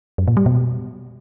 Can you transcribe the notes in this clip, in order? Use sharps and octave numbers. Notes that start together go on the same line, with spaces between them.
F#2
A#2
G3
B2